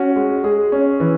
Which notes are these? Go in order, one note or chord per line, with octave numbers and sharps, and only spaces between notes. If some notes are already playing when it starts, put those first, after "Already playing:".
Already playing: C#4 F#4
G#3
G#3 G#4
C#4
E3